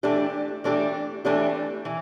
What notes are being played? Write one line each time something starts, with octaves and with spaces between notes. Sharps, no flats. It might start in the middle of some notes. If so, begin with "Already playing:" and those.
E3 A3 D4 G4
E3 A3 D4 G4
E3 A3 D4 G4
E3